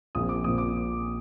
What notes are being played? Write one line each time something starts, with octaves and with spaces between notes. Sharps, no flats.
A#1 A#2 F3 C4 D#6
D6
A#1 A#2 F3 C4 D#6
D6